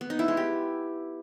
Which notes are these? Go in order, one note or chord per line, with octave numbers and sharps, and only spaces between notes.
B3
D#4
E4
G#3
G4